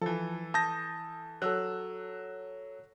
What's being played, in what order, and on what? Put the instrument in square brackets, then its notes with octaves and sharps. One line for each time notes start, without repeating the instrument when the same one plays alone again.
[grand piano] E3 A4 [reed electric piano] F3
[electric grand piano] A5 G6 A#6 [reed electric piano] D#6
[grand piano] F#3 [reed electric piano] A4 E6 F#6